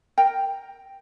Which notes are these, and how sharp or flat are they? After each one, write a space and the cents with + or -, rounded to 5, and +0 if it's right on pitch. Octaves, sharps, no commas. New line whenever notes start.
A#4 +0 G5 +5